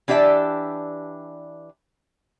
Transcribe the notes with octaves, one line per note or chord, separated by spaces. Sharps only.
E3 D4 G4 D5 E5 A5